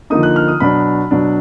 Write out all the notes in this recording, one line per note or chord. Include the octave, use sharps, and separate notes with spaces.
D3 F3 A#3 D#4 D#6
F#6
F6
D#6
B2 F#3 D4 B5
B2 F#3 D4